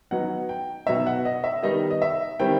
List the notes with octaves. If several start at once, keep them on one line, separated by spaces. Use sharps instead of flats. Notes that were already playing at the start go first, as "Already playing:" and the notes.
F#3 B3 D#4 F#5
G5
B2 F#3 B3 D#4 E5
F#5
D#5
E5
D#3 G3 B3 D#4 D#5
D#5
E5
D#3 G3 C4 E4 G5